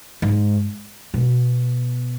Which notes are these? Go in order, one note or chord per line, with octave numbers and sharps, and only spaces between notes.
G#2
B2